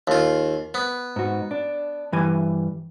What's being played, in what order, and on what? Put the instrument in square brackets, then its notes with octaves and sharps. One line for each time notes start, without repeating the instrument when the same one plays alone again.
[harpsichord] D#2 F4
B3
[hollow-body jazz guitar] G#2 F#4
D4
G2 E3 G#5